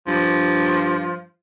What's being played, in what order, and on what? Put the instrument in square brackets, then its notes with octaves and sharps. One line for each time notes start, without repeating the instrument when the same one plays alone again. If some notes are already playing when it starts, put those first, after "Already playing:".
[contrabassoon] G2 [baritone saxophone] F3